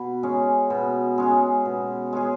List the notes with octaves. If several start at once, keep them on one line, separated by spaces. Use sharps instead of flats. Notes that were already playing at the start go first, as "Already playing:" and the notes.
Already playing: B2
G#3 C#4 G#4
B2
G#3 C#4 G#4
B2
G#3 C#4 G#4